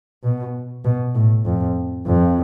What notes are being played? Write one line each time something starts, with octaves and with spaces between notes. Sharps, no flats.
B2
B2
A2
F2
F2